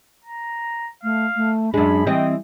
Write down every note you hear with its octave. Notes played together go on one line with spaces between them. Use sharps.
A#5
A3 F5
A3
F#2 G#3 D4 B5
E3 G3 C4 D#5 G5